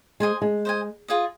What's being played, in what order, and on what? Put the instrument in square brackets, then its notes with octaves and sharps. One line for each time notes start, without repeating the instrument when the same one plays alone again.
[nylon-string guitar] G#3 [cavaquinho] C5 D#5 G#5 C6
[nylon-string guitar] G#3
[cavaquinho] C5 D#5 G#5
F4 G#4 D#5